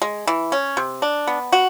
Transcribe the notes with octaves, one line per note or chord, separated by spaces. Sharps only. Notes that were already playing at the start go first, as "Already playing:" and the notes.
G#3
E3
C#4
C3
D4
B3
F#4